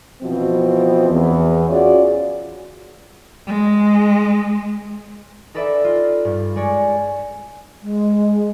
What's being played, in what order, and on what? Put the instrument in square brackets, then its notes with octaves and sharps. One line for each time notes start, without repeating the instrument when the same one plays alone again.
[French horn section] B2 E3 F3 C4
E2
C#4 F4 F#4 G#4 C#5 D5
[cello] G#3
[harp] D#4 A4 B4 D5 E5
F4
G2
G#3 C#5 D5
[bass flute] G#3